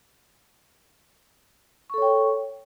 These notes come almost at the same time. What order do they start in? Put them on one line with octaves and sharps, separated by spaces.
C#6 A4 C#5 G5